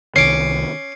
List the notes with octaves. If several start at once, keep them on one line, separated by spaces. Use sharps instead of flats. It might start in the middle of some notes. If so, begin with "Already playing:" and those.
C2 D#3 C#4 D6 C7